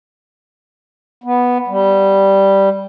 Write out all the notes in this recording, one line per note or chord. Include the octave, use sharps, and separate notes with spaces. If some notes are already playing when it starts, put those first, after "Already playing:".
B3
G3